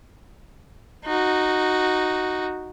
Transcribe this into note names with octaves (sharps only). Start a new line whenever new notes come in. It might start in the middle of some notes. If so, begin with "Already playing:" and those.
D#4 F#4